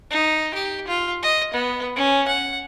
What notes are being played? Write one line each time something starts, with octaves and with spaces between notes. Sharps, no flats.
D#4
G4
F4
D#5
B3
C#4
F#5